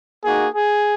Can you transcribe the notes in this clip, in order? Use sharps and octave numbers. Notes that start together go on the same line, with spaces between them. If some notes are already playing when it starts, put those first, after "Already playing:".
A#3 D#4 F#4 G#4
G#4